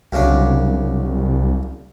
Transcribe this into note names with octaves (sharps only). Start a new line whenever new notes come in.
C2 F#2 C#3 D4